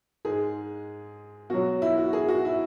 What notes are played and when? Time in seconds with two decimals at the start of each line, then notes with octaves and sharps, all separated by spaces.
0.25 G#2 G#3 G#4
1.50 B2 F#3 F#4
1.82 E4
1.98 F#4
2.13 G#4
2.28 F#4
2.45 E4